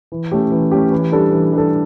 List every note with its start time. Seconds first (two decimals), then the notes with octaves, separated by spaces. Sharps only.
0.12 E3
0.31 A3 C#4 G4
0.52 E3
0.71 A3 C#4 G4
0.92 E3
1.12 G3 D4 A4
1.32 E3
1.53 G3 D4 A4